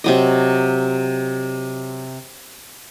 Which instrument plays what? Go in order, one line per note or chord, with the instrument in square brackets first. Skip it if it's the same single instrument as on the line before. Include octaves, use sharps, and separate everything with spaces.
[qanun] C3 F#3 D#5